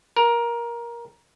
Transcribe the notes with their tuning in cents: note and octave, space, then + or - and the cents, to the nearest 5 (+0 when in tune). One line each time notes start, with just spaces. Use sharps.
A#4 +15